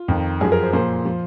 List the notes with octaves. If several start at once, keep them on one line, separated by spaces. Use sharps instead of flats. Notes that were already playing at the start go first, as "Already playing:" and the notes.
Already playing: F4
F2 D#3
F#2 F3 G#4
A#4
C5
A#2 F3 C5
F3